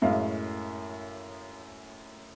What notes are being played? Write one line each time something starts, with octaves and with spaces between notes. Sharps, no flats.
F#2 A2 G#3 F5